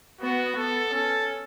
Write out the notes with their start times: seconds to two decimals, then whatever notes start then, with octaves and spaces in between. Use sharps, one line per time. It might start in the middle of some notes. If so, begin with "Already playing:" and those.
0.21 B3 F#4
0.57 B3 A4
0.93 C#4 A4